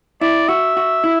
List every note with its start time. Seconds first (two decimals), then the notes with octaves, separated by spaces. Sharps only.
0.21 E4 D5
0.48 F#4 E5
0.77 F#4
1.04 E4